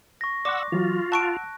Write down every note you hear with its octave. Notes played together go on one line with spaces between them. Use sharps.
C#6 A#6
D5 F#5 C6 D6 E6 F#6
E3 F#3 F4 F#4
F#5 A5 C#6 E6 F#6 D7